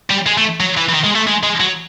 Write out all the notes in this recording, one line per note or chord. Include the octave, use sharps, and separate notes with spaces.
G3
G#3
A3
F#3
E3
E3
D#3
G#3
A3
G#3
G#3
F#3